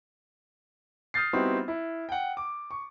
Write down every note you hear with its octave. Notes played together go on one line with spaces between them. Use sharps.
D#6 F6 G6 A6 C7
G3 B3 C4 D#4 E4 F#4
E4
F#5 G5
D6
C#6